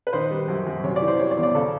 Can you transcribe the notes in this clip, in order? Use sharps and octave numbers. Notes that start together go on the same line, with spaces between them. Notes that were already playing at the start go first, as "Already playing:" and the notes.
B4
D#3 C5
G3
F#2
F#2
C3 C#5
D5
E3
C5
G3 C#5
D5
E2
D5
C#3 A4